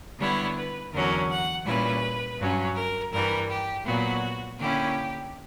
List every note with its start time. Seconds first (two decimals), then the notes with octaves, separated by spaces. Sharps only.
0.19 D3 G3 B3 E4 C#5
0.56 B4
0.92 E2 D3 F#3 C#4 A#4
1.29 F#5
1.65 A#2 G3 C#4 E4 B4
2.39 G2 F#3 C#4
2.75 A#4
3.12 G2 E3 G3 A#4
3.49 G4
3.85 A#2 F#3 B3 F#4
4.58 D3 A#3 C#4 E4 G4